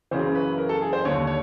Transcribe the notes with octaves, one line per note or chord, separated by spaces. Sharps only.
F#1 F#2 C#3 E3 C5
B4
A#4
A4
G#4
C5
D#2 D3 C#5
C#5